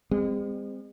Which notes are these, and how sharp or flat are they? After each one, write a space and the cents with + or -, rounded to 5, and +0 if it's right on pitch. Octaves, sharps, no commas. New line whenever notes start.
G#3 -40 C4 -20